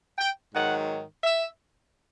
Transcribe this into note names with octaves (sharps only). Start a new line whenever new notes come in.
G5
G#2 D#3 F#3 F#5
E5